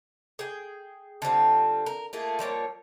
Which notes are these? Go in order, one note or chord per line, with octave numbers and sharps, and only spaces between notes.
G#4 G5
D3 G3 C4 F4
A#4
A3 A#3 F4 G#4
F3 G3 A#3 C#5